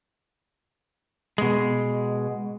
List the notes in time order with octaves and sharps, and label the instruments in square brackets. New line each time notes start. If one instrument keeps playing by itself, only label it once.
[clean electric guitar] B2 G#3